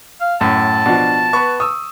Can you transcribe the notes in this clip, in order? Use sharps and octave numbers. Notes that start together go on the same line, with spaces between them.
F5
F#2 A2 A5
B2 F3 D4
B3 B4 B5 C#6
C#6 D#6 E6